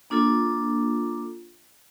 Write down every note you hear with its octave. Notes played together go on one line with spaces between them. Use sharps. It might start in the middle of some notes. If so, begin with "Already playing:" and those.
A#3 D4 F4 A4